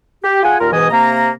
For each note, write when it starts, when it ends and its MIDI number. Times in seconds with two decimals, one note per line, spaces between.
0.23 0.42 67
0.43 0.56 65
0.43 0.56 68
0.43 0.56 78
0.43 0.56 80
0.59 0.70 39
0.59 0.70 46
0.59 0.70 65
0.59 0.70 70
0.72 0.88 44
0.72 0.88 47
0.72 0.88 52
0.72 0.88 75
0.72 0.88 80
0.72 0.88 87
0.90 1.29 48
0.90 1.29 58
0.90 1.29 82